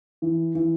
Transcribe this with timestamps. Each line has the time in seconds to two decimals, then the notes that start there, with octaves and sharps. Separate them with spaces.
0.22 E3
0.55 E3